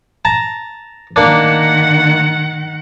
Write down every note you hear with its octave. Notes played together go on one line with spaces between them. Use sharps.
A5 A#5
D#3 A#3 D4 F#5